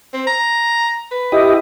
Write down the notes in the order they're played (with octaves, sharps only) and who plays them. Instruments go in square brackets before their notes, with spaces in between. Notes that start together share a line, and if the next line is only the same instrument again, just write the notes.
[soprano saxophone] C4
A#5
B4
[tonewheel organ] E4 G4 D#5